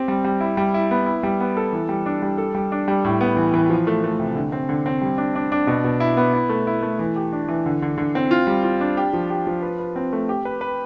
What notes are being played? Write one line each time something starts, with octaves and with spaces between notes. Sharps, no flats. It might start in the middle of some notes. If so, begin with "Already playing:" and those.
Already playing: C4 G4
G3
G3
E4
G3
E4
B3
E4
G3
B3
A4
E3
G3
D4
G3
A4
G3
D4
G3
A2
B3
E3
E3
F3
A3
A3
C3
D3
C4
D3
C4
G3
D4
D4
D4
B2
B2
E4
B3
E4
A3
E4
A3
E3
G4
D4
E3
D3
D3
D3
C4
F4
G3
F4
D4
G4
F3
G4
F3
B4
B4
C4
A3
G4
B4
B4